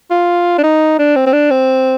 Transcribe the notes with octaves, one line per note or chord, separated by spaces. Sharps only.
F4
D4
D#4
D4
C4
C4
D4
C4